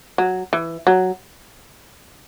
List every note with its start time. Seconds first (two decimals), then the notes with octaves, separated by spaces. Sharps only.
0.18 F#3
0.53 E3
0.87 F#3